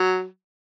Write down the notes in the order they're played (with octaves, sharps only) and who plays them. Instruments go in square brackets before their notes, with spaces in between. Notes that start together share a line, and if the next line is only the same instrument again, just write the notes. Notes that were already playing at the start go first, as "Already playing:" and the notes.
Already playing: [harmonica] F#3